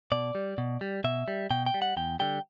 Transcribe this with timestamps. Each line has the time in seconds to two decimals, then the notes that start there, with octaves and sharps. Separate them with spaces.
0.12 B2 D5
0.35 G3
0.58 B2
0.81 G3
1.04 B2 E5
1.28 G3
1.51 B2 G5
1.66 G5
1.74 G3
1.82 F#5
1.97 E2 G5
2.20 D3 G3 G5